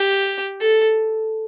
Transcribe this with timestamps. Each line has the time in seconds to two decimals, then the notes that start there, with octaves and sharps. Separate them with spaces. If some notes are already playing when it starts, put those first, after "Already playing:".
Already playing: G4
0.60 A4